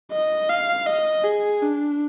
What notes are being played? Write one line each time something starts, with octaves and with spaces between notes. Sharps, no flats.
D#5
F5
D#5
G#4
D4